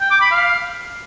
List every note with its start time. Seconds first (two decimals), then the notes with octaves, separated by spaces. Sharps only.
0.01 G5
0.11 D6
0.21 B5
0.31 F5